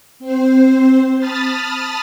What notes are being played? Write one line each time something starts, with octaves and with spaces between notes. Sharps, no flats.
C4 C5
A5 B5 D#6 F6 A6